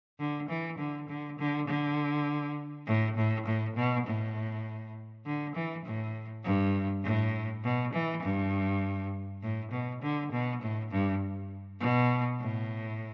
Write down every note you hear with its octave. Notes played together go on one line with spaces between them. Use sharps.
D3
E3
D3
D3
D3
D3
A2
A2
A2
B2
A2
D3
E3
A2
G2
A2
B2
E3
G2
A2
B2
D3
B2
A2
G2
B2
A2